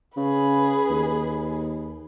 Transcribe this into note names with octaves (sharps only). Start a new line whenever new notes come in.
C#3 G#4 B4
D#2